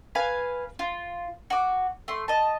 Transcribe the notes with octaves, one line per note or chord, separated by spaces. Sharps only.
B4 F5 G#5
F4
F#4 D6
A3 C6
D#5 A5